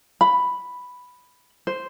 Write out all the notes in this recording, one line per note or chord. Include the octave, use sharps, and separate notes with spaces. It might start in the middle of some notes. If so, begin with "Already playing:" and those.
B5
C5